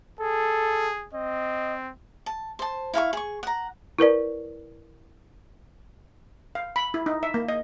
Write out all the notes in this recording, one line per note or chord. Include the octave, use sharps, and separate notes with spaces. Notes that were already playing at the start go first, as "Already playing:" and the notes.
G#4 A4
C4 D#5
A5
C5 A5
E4 F5 A5 C#6
G#4 C#6
F#5 A#5
E4 A#4 B4 D5
F5
B5
E4
D#4
E5
A#3
D#5